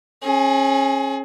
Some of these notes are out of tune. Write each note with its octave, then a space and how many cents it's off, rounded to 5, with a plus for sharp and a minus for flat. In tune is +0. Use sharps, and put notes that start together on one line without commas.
C#4 -30 G#4 +30